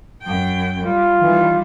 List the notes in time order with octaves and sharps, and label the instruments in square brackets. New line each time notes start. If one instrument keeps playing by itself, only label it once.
[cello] F#2 G5
[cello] G3 [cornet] F4
[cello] D#3 G3 [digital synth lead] E3